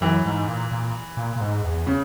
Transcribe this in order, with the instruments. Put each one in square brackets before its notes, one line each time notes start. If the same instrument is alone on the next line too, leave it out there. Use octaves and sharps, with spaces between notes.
[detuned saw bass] F#2 [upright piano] E3
[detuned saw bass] G#2
A#2
A#2
A#2
A#2
G#2
E2
[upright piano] C#3